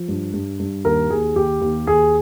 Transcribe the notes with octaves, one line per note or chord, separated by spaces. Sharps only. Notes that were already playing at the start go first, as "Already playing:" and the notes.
Already playing: F3
G2
G2
G2
D#2 A#4
D#2 G#4
D#2 G4
D#2
D#2 G#4